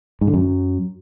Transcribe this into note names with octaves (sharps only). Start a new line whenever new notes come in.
G#2
D3
F#2